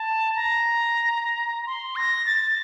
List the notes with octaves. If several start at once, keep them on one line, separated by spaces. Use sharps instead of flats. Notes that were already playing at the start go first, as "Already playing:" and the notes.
Already playing: A5
A#5
C6
A#6
A6